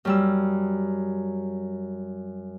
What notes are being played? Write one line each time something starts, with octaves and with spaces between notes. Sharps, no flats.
F#2 G3 E6